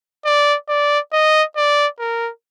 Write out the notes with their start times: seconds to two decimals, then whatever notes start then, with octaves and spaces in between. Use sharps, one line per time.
0.25 D5
0.69 D5
1.12 D#5
1.56 D5
1.99 A#4